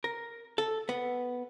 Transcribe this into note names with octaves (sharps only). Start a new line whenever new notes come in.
A#4
A4
B3